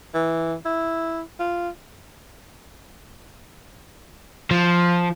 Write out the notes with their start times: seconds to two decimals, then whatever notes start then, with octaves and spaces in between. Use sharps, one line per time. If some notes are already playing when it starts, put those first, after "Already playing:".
0.14 E3
0.66 E4
1.40 F4
4.51 F3